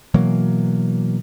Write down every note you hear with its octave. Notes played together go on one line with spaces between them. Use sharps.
B2 E3 F#3 A#3